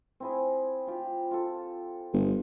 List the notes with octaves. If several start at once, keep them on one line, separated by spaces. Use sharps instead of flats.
C4 E4 G#4
F4 G4
F4 A4
G1